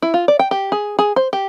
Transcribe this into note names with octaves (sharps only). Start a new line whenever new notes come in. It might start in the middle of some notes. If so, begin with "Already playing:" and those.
E4
F4
D5
G5
G4
G#4
G#4
C5
G4